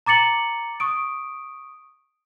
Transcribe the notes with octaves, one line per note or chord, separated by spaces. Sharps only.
A#5 D6 A6 C#7 F#7
C#6 D#6 D7